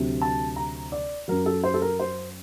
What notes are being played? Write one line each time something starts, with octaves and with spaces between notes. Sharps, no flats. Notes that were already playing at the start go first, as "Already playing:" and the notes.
Already playing: D2 C3 F#3
A5
A#5
D5
F#2 F#3 A#4
A4
C5
A4
A#4
C5